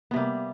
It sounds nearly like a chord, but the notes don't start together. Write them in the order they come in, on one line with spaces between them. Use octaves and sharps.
B3 C3 G3 A#3